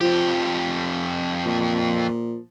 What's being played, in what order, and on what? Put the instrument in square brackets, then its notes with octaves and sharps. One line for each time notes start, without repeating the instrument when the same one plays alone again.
[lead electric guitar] F2 G4 [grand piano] F3
[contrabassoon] A#2